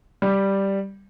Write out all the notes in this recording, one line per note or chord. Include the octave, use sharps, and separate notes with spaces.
G3